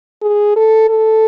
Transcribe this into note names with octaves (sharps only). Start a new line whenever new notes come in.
G#4
A4
A4